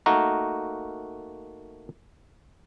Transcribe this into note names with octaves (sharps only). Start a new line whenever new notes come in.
A3 A#3 D#4 F#4 A#4